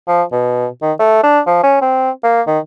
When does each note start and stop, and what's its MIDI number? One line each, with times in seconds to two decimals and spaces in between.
0.08 0.23 53
0.32 0.67 47
0.82 0.93 51
0.99 1.21 57
1.23 1.40 62
1.47 1.59 53
1.63 1.77 61
1.82 2.10 60
2.24 2.42 58
2.47 2.59 51